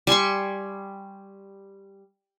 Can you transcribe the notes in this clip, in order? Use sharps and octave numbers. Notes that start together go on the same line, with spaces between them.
G3 G#5 C6 C#6